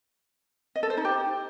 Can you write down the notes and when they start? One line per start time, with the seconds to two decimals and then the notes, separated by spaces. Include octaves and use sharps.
0.76 D#5
0.83 A4
0.90 C5
0.97 D#4
1.05 G4